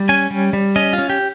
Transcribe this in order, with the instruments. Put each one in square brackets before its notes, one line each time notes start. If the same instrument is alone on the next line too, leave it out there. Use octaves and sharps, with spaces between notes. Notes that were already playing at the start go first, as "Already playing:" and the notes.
Already playing: [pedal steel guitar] G3
C#4 G#5
G3
G3
C#4 D#5
F4
C#4
G4